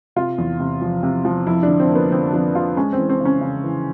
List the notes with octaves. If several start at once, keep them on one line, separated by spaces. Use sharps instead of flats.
C3 F4
E2
C3
F3
C3
F3
F2 E4
D4
D3
C4
A#3
B3
D3 C4
F2 D4
D3 F4
G#3 C#4
C4
E3
C4
C#3 C#4
C#3
E3